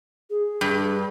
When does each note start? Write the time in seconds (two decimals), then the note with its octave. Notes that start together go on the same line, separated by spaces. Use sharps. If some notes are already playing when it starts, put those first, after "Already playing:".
0.30 G#4
0.61 G2